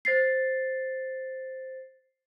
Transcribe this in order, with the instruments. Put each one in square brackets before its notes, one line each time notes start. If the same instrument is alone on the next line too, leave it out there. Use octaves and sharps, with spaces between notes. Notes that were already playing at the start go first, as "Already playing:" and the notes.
[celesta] C5 A6 C7